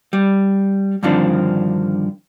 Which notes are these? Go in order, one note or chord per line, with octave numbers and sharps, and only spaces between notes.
G3
G2 D3 D#3 F3 C4 D4